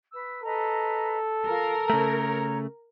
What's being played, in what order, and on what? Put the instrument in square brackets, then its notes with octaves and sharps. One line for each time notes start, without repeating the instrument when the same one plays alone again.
[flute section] B4 E6
[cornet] A4 [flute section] B4 D#5 A#5
[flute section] F4 [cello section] A#4
[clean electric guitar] C#3 A3 [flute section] C#5 A#5